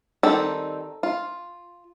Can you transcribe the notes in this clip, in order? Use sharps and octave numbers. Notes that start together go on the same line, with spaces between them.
D#3 G3 C4 D#4 A4
F4